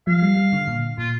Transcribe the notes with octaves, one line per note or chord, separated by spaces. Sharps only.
F3 F5
G3
G3
D3
A#2
A#2 F4